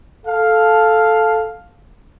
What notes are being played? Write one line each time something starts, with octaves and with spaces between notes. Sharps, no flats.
A4 F5